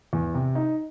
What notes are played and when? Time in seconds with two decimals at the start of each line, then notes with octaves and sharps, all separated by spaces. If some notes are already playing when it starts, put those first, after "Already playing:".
0.13 E2
0.34 C3
0.55 D#4